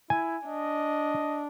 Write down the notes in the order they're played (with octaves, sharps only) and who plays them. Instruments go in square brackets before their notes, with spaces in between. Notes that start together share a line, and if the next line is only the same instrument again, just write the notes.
[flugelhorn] E4 [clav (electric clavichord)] G#5
[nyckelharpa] D4 [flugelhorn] D#5